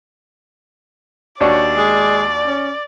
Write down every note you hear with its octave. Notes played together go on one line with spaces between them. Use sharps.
D#2 D4 F#4 C#5 D5
G#3
C#4